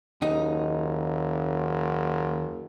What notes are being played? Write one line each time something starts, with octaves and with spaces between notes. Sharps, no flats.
F#1 D#2 D#4